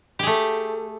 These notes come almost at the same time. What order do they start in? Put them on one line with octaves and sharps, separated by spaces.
G4 G#4 A3